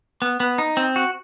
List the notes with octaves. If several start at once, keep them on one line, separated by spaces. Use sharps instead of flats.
B3
B3
D#4
C4
F#4